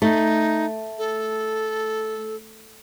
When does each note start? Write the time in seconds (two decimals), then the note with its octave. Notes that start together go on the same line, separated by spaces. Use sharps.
0.02 A3 D#4
0.98 A4